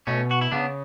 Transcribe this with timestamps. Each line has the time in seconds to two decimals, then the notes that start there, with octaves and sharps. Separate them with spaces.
0.07 B2 A3 C#4
0.31 F#4
0.41 E4
0.51 C#3 B3 D4